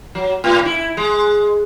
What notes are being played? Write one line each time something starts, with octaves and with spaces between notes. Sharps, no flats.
F#3
A2
E4
G#3